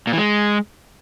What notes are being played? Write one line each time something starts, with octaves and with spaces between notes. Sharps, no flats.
A#2
E3
G#3